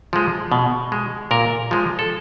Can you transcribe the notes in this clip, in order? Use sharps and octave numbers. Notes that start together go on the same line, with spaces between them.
F3 G#3
B2
G#3
A#2 A#4
F3 G#3
A4